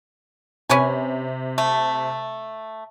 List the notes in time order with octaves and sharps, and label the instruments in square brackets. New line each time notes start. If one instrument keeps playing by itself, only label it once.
[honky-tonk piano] C3 [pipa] C#4 B4 G#5
[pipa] A3